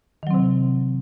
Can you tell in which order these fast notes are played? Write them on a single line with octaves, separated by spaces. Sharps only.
D#3 F#3 C4 C3